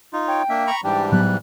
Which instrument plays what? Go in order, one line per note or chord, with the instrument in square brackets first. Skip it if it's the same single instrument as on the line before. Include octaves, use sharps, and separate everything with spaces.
[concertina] D#4 F4
[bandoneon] C#5 [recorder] G5
[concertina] A#3 E5 [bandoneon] D4
[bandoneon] A#5 B5 C#6
[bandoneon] G#2 E3 G3 [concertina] D4 G4 [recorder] G5
[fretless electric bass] A2 F#3 B3 [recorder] F#6